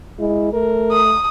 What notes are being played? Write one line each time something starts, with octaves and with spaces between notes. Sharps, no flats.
G#3 E4
A3 A#4
D#6